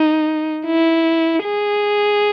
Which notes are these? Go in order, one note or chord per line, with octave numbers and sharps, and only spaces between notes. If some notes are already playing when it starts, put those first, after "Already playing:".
Already playing: D#4
E4
G#4